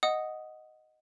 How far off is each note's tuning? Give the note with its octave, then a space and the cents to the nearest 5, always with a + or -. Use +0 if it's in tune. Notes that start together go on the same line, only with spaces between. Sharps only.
D#5 +0 F#5 +0 D#6 +0